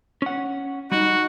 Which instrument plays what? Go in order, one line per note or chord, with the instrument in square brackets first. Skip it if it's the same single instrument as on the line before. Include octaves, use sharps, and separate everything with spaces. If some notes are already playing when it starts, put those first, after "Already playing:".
[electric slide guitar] C#4 F#5
[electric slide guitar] G3 [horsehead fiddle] D#4 [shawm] F#4